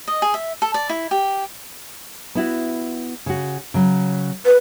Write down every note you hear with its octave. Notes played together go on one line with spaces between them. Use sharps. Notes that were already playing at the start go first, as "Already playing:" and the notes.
D#5
G#4
E5
A4
D5
E4
G4
B3 E4 F#4
C#3 F#4
C#3 F#3
B4